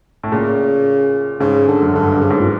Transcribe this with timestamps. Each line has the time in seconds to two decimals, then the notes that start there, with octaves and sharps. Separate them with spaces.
0.23 A2
0.32 A#2 C#3
1.40 G#2 C#3
1.68 D3
1.82 F#2
1.94 G2 D3
2.12 G2
2.21 C#3
2.30 G#2
2.39 A#2